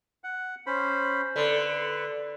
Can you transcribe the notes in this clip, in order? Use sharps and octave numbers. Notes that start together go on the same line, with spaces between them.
F#5
C#4 C5 B5
D3 B4